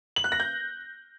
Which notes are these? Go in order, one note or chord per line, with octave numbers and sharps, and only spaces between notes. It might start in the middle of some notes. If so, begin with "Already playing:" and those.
F#7
F#6
A#6
G6